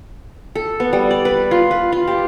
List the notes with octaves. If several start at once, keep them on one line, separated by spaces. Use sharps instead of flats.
A4
B3
G3
D5
B4
F4
B4
F4
G4